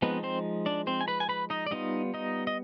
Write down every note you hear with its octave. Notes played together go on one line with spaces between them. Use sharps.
F3 G#3 B3 C4 D#4 B4
C4 C5
D4 D5
C4 C5
G#5
B4 B5
G#5
B4 B5
D#4 D#5
D5
G3 B3 D#4 F4 D#5
D#4 D#5
D#5